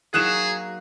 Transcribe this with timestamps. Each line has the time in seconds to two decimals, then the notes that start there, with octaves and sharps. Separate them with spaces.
0.14 F#3 A#3 D#4 G#4 F#6 E7